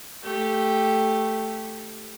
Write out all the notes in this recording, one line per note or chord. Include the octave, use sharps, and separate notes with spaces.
A3 G4